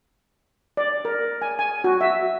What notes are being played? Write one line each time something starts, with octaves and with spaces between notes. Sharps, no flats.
D5
A#4
G#5
G#5
F#4
E5